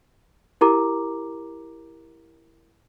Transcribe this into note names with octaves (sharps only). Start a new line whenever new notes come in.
E4 G4 A#4 A#5 D6